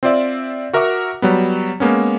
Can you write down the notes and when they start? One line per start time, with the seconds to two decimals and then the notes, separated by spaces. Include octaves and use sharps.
0.03 C4 F4 C5 D5 E5
0.73 F#4 A#4 E5 F#5 D6
1.22 F#3 G3 B3
1.80 G#3 A#3 B3 C#4